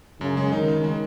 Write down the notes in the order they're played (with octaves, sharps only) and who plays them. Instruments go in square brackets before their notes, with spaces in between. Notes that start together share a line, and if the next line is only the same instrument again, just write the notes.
[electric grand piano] F#2 [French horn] C#3
[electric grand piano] G#3
[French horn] D#3 [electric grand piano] D#4
[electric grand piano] C#3
G#3